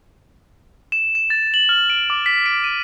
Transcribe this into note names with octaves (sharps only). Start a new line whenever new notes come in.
E7
E7
A6
F#7
F6
D7
D6
B6
D7
D#7